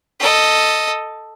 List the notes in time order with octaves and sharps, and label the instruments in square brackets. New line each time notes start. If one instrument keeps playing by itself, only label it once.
[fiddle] A4 D#5